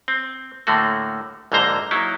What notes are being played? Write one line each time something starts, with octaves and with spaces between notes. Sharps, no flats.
C4
A2 D3 A3 A#3 F#4
A#1 G#2 D3 A#3 C5 A#5
F#3 A#3 D#4 E4